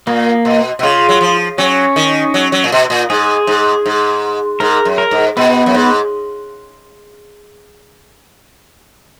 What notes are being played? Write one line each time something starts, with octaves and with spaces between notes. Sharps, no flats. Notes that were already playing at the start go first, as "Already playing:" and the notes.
A#2 A#3
B2
B2
C#3 F4
F#3
F3
F#3 C#4
D#3
F#3
F#3
A#2
B2
A#2
G#2 G#4
G#2
G#2
G#2 A#4
F#2
A#4
G#2
B2 B3
F#2
G#2